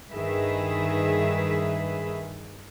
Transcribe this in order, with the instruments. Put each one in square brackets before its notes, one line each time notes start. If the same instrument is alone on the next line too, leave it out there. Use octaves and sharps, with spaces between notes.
[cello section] G2 D#3 G#4 B4 E5